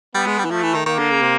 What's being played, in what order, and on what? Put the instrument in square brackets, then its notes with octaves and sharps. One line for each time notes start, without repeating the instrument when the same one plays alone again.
[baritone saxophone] G3 [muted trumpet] B3
[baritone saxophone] G#3
G3
E3
[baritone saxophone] F3 [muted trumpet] A3
[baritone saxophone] E3
D#3
[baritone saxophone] D#3 [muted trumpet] A#3
[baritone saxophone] D3
C#3
C3